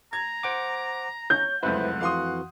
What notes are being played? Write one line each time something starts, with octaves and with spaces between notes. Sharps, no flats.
A#5 G#6
C5 F#5 D6 D7
C#5 G6
F1 C#2 F#2 E4 B4 C5 F#5
F2 E3 F#4 F5 C6 D#6